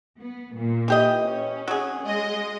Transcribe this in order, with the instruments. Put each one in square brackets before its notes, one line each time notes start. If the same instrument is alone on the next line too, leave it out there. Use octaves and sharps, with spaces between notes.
[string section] B3
A#2
[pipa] E3 G4 D#5
[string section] C#4
[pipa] F#3 G#4
[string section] G#3 D#5